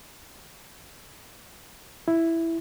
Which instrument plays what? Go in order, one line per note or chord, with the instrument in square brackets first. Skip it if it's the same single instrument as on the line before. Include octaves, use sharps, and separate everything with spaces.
[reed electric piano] E4